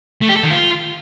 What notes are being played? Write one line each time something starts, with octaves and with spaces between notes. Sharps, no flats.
A3
G4
A4
D#3
F4